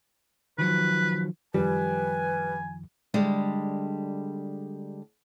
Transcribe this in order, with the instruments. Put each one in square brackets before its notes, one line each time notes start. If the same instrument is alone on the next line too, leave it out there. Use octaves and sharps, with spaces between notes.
[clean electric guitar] D#3 F3 F#3 [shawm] B4
[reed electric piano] F#2 D#3 F3 [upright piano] G3 [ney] B4 [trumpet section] G#5
[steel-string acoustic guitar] D3 G3 G#3